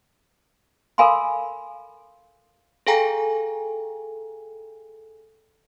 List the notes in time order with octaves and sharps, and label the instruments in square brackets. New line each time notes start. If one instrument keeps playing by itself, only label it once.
[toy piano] A4 A#4 F5 G#5 B5 C6
[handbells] G#4 A4 F5 G5 G#5 A#5